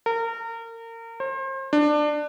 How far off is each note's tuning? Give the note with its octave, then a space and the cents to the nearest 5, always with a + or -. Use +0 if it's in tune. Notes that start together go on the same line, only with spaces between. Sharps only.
A#4 -30
C5 +35
D4 +20